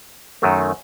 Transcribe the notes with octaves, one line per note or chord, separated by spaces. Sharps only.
F#2 D#3 F#3 A3